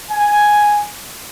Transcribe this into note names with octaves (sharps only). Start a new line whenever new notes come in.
G#5